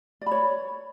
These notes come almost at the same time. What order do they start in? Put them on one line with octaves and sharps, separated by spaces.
D5 B5 C#5